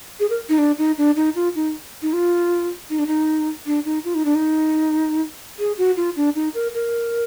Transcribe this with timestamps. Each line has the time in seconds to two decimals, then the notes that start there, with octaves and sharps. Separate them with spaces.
0.20 G#4
0.30 A#4
0.49 D#4
0.58 D4
0.78 D#4
0.98 D4
1.16 D#4
1.35 F4
1.55 D#4
2.02 D#4
2.13 F4
2.90 D#4
2.99 D4
3.07 D#4
3.66 D4
3.85 D#4
4.05 F4
4.15 D#4
4.25 D4
4.35 D#4
5.59 G#4
5.78 F#4
5.97 F4
6.16 D4
6.35 D#4
6.54 A#4
6.74 A#4